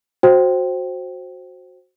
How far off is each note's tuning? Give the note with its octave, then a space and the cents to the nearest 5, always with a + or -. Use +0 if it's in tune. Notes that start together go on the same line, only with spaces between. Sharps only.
F#4 -10 C5 +10 G5 -15